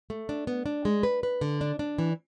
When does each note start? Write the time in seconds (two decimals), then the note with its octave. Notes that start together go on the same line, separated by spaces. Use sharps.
0.10 A3
0.29 D4
0.47 B3
0.66 D4
0.85 G#3
1.03 B4
1.23 B4
1.41 D3
1.61 D4
1.79 D4
1.98 E3